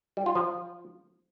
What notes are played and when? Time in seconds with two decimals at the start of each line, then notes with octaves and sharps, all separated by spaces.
0.17 G3
0.26 F4
0.35 F3